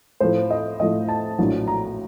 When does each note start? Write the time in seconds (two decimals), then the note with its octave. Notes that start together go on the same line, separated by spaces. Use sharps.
0.20 A2 F3 A3 C5
0.51 D#5
0.79 A2 F3 A3 D#5
1.08 A5
1.39 A#1 A2 F#3
1.68 A#5